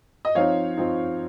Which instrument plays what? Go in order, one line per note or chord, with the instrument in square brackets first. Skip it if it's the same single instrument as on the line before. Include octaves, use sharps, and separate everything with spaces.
[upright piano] D#5
F3 C4 D#4 C#5 F5
F3 C4 D#4